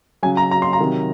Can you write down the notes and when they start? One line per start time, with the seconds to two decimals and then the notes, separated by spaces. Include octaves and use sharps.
0.23 C#3 F#3 G#5
0.37 A#5
0.51 A#5
0.62 C6
0.73 A#5
0.79 C3 D#3 F#3